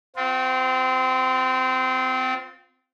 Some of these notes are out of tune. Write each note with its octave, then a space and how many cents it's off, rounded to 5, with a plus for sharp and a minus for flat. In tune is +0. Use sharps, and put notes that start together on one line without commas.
C4 -25 F4 +20